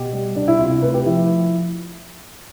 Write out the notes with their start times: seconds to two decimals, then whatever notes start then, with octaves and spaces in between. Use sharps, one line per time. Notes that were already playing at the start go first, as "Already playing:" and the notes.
Already playing: B2 G4
0.13 G3
0.35 B2 D4
0.48 E4
0.59 C3 F4
0.71 E4
0.82 A3 B4
0.94 G4
1.05 F3 E4